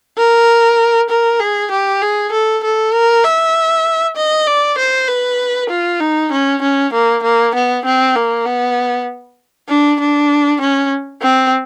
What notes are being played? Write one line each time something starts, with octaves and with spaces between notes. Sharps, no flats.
A#4
A#4
G#4
G4
G#4
A4
A4
A#4
E5
D#5
D5
C5
B4
F4
D#4
C#4
C#4
A#3
A#3
B3
C4
A#3
B3
D4
D4
C#4
C4